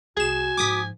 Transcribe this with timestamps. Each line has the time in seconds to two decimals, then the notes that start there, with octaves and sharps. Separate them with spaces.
0.17 C2 F#4 G#4 G#5 E7
0.58 G#2 F3 D6 D#6 B6